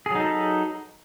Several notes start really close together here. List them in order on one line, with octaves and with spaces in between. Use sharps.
G#4 F#3 D#4 A4 B4